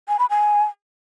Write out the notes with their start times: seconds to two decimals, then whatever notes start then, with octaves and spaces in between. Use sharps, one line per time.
0.08 G#5
0.19 B5
0.30 G#5